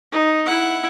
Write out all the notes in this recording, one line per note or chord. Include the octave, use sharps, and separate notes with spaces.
D#4
E4 F#5